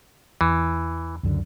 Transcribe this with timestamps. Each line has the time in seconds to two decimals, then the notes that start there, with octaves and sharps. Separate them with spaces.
0.41 E2 E3
1.23 C#2 F#2 D3